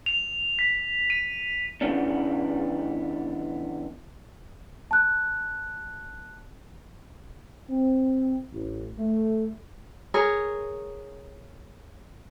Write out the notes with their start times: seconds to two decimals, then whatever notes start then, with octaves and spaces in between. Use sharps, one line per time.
0.06 F7
0.59 B6
1.10 D#7
1.81 C#3 E3 B3 C#4 D4
4.91 A5 F#6
7.69 C4
8.53 A1
8.99 A3
10.14 G#4 A#4 C#5